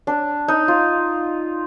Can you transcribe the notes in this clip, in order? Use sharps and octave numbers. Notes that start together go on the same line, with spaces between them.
D4
D#4
F4